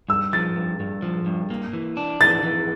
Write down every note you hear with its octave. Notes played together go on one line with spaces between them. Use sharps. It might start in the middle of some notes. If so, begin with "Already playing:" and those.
G2 E6
F3 A6
G2
G2
F3
G2
A#3
E3
D4
E3 A6
E3